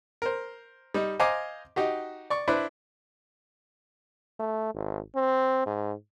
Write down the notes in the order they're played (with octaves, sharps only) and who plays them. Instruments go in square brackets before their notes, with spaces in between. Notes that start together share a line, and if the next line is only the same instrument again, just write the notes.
[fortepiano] A#4 C5
G3 D#4
C5 D#5 F5 G#5 A#5 D6
D#4 F#4 G4
D5 C#6
D4 E4 B4 C5
[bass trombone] A3
G#1
C4
G#2